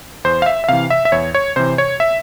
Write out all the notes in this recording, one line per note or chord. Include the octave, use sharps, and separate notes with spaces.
E2 C5
F5
E5
E5
C3 E3 F5
E5
E5
E2 C#5
C#5
C3 E3 C5
C#5
E5